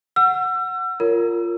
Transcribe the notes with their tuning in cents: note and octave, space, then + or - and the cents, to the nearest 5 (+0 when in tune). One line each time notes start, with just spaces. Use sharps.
F#5 -10 E6 +35
F4 -10 A#4 -15 C#5 +10